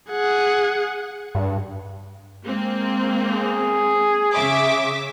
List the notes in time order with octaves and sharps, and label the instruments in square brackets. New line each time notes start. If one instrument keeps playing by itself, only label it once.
[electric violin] G#4 F#5
[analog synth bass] G2
[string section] G#3 A#3 C4
[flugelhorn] G#4
[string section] C#3 E5 D6